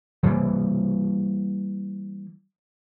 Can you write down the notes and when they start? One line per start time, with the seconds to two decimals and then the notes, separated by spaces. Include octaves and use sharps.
0.23 E3 G3 A#3